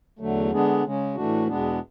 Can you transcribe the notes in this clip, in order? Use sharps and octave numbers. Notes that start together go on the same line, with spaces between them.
E2 D3 F#3 A3
D3 G#3 B3 D4 G#4
C#3 G#3 C#4
A2 E3 A3 D4 F#4
E2 B2 G#3 B3 D4